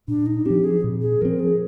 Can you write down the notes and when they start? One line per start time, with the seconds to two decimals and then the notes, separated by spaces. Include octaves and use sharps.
0.08 A#2 D4
0.26 D#4
0.46 F3 C4 G4
0.64 G#4
0.84 A#2
1.02 G#4
1.21 F3 C4 A#4
1.40 G#4